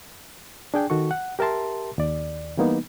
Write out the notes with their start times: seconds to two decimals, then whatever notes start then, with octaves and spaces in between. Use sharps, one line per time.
0.74 D4 G#4 G5
0.90 D#3 F#4 A4 C#6
1.11 F#5
1.39 G4 A#4 E5 A5 C6
1.98 D#2 D5
2.57 E3 G3 A#3 B3 D#4